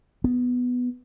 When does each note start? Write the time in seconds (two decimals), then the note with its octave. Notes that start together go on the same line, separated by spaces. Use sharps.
0.24 B3